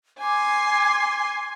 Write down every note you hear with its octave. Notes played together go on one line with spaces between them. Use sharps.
G#5 C6 D6